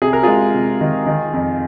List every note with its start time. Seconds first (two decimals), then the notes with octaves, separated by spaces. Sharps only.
0.02 C3 G#4
0.13 A#4
0.23 G#3 F4 G#4
0.54 C3
0.81 D#3
1.07 D#3
1.33 F2